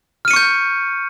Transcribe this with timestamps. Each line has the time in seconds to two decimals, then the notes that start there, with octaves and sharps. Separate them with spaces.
0.25 F6
0.28 D#7
0.31 C#7
0.33 C#6
0.36 G6